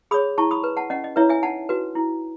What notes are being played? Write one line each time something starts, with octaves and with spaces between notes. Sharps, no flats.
G#4 C#5 B5 D#6
E4 A5 C#6
B5 D#6
B4
F#5 A5
C#4 D#5 F#5
D#5
E4 B4 C#5 E5
E5 G#5
D#4 F#5 A5
F#4 B4
E4